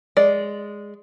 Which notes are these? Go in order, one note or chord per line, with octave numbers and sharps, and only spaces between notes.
G#3 D5